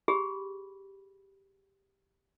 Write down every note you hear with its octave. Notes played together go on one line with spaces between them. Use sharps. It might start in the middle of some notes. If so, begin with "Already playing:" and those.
G4 G#4 B5